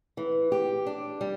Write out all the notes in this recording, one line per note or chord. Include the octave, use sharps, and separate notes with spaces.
E3
G4
D4
G3